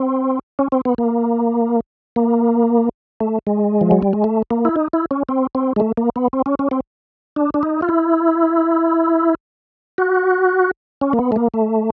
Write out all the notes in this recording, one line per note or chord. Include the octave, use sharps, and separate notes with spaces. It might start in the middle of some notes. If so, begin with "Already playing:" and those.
Already playing: C4
C#4
C4
B3
A#3
A#3
A3
G#3
F3
F#3
G3
G#3
A3
A#3
E4
D#4
E4
C#4
C4
C4
G#3
A3
A#3
B3
C4
C#4
C#4
C4
D4
D4
D#4
F4
E4
F#4
C#4
A#3
B3
A3
A#3
A3